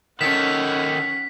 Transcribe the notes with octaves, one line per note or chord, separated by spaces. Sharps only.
D#3 C#4 A4 F#5 B6